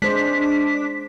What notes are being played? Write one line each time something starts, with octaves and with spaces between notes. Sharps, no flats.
G#3 D4 C5 B6